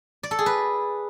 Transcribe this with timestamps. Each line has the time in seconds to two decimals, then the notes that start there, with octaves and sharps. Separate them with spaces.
0.23 D5
0.31 A4
0.39 G#4
0.46 B4